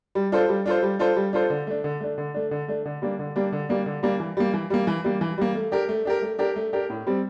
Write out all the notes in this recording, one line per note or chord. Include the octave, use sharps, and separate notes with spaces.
G3
D4 F4 A4 C5
G3
D4 F4 A4 C5
G3
D4 F4 A4 C5
G3
D4 F4 A4 C5
D3
A3 D4
D3
A3 D4
D3
A3 D4
D3
A3 D4
D3
G3 A#3 D4
D3
G3 A#3 D4
D3
G3 A#3 D4
D3
G3 A#3 D4
E3
G3 A#3
E3
G3 A#3
E3
G3 A#3
E3
G3 A#3
A3
D4 G4 A#4
A3
D4 G4 A#4
A3
D4 G4 A#4
A3
D4 G4 A#4
A2
G3 C4